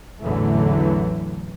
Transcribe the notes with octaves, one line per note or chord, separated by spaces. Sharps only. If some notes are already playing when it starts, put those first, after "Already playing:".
A1 E2 D3 E3 F#3 A3